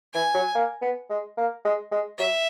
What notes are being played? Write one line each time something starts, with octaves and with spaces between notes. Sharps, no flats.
E3 G#5
F#3
A#3
B3
G#3
A#3
G#3
G#3
F#3 E5